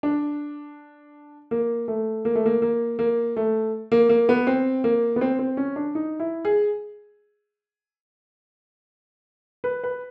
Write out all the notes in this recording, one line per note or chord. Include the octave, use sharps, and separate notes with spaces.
D4
A#3
A3
A#3
A3
A#3
A#3
A#3
A3
A#3
A#3
B3
C4
A#3
B3
C4
C4
C#4
D4
D#4
E4
G#4
B4
B4